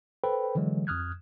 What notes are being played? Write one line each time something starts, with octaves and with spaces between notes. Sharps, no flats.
A4 B4 C5 G5 B5
D3 E3 F#3 G#3
F2 D#6 F6 F#6 G#6